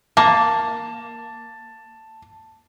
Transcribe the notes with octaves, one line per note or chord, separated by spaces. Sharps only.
A#3 A5